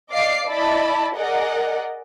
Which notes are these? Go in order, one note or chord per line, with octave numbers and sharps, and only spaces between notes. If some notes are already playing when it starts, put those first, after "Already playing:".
D5 D#5 F5 D6 C7
E4 D5 D#5 A5 B5
G#4 A#4 D5 D#5 F#5